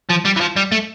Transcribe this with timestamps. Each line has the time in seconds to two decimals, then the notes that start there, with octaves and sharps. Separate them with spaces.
0.09 F3
0.25 G3
0.36 E3
0.41 F3
0.56 G3
0.72 A3